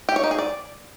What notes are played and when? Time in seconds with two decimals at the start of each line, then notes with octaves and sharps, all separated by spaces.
0.09 G4
0.16 C#5
0.24 D#4
0.31 G#4
0.39 D5